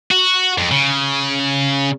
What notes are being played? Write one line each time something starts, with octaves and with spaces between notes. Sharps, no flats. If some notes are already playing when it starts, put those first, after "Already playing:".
F#4
F2
C#3